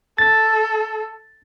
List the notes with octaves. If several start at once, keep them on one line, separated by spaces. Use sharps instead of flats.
A4 A6